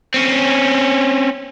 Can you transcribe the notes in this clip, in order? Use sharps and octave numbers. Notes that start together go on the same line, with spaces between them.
C4 C#4